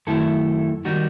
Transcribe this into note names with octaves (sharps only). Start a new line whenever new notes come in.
F#2 D#3 A3 E4 A4
D#3 G3 D#4 F#4